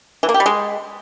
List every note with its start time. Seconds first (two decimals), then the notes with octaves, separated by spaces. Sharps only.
0.23 E3
0.29 A#3
0.34 G4
0.40 G3
0.46 G#3